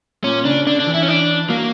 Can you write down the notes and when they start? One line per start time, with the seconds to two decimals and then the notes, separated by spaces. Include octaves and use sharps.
0.24 A#2 C#4
0.45 C#3 D4
0.67 D3 D4
0.80 D4
0.87 E3
0.94 E4
1.02 C#4
1.08 D4
1.49 F#3 A#3